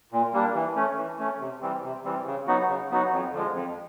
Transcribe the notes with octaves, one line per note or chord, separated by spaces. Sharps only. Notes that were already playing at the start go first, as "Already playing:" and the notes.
A#2
G3 A#3 D4
E3
A3 C#4
E3
A3 C#4
C3
E3 G3 C4
C3
E3 G3 C4
C#3
F#3 B3 D#4 F#4
C#3
F#3 B3 D#4 F#4
F2
D3 F3 G#3
F2